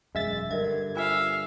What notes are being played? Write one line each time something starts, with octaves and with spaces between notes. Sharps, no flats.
E1 F#2 G#3 E5 A6
G2 D3 A#4 D#5 E5 G#6
F4 C5 E5 F5 G#5